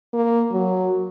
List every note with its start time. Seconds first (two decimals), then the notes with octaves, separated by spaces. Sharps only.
0.13 A#3
0.53 F#3